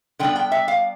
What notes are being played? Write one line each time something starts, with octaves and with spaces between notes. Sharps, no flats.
D3 G3 B3 D4 G5
G5
E5
F5